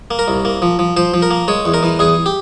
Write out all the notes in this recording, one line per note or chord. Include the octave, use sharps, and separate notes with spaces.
A#3
A#4
C2
A#3
F3
F3
F3 C5
F3
A#4
A#3
G#3 C#5
E2
A#4
E3
E2 G#4
G4